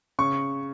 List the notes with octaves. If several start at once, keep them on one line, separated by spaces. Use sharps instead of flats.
C#3 C#6